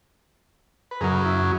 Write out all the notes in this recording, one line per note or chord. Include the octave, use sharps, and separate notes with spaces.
B4
F#2 C#3 F#3 G#4 A#4
E4